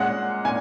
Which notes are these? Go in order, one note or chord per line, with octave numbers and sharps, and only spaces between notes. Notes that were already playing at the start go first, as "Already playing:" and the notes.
Already playing: A#2 G#3 C#4 F#5
A#2 G#5